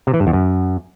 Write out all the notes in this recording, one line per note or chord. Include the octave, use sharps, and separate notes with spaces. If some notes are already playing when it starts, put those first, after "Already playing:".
C3
E3
G2
E2
F#2